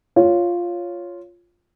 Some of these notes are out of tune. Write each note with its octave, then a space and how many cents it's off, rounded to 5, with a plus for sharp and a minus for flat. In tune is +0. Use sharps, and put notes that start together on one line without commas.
F4 +0 C#5 +0